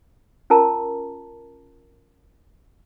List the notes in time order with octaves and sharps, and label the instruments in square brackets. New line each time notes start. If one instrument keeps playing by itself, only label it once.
[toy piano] C#4 F4 A#4 A5 A#5